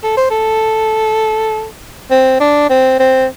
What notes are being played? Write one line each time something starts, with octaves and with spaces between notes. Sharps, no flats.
A4
C5
A4
C4
D4
C4
C4